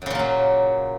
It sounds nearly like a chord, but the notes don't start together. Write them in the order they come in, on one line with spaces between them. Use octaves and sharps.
F#2 C#3 A#2 A#3 F#3